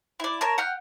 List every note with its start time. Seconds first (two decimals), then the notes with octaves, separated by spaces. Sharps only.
0.20 E4 D5
0.41 A#4 C#5 A5
0.58 F#5 G5 F6